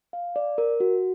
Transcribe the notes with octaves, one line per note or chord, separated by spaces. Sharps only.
F5
D5
A#4
F#4